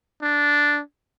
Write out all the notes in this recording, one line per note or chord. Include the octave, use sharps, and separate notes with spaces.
D4